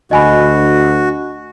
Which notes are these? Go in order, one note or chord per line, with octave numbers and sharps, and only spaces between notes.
D2 F#4 D#5 G#5 B5